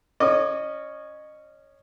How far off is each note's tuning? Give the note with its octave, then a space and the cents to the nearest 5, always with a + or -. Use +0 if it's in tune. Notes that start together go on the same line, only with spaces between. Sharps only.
C#4 +0 D#5 -25 D6 +25